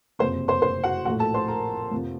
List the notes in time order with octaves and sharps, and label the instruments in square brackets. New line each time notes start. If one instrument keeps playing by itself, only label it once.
[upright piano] F#1 F2 C3 C5 C6
C5 C6
C5 C6
F#4 F#5
A#1 A2 F3 A3 F#4 F#5
A4 A5
C5 C6
A#4 A#5
F2 C3 F3